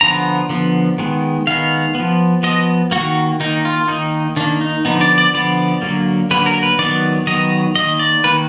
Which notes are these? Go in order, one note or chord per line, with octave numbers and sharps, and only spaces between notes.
D3 F3 B3 A#5
D3 F3 B3
D#3 G#3 B3
D#3 G#3 B3 F5
F3 B3
F3 B3 D#5
D#3 A#3 F#4
D#3 A#3 D#4
F4
D#3 A#3 D#4
D#3 A#3 D4
D#4
D3 F3 B3 D#4
D5
D5
D3 F3 B3 D5
D3 F#3 A#3
D3 F#3 A#3 B4
A#4
B4
D#3 F#3 B3 D5
D#3 F#3 B3 D#5
D#3 A#3 D#5
D5
D#3 A#3 B4